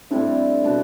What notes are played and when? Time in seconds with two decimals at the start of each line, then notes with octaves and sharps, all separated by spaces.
0.11 A2 G3 C4 D4 E4
0.64 B2 B3 D4